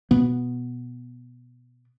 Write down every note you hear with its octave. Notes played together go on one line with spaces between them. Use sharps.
B2 B3